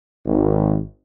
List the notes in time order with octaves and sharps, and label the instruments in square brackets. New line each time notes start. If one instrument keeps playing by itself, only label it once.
[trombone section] G#1